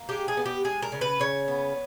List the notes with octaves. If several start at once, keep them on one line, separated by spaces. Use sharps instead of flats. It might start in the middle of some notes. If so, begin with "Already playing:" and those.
Already playing: A#3
G#3 G4
G#4
B3
G4
G#3 G#4
A#4
C#3
B4
C#3 C#5
B3